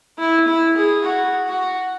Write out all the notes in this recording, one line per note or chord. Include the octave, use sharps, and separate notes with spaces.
E4
E4
G#4
F#4
F#4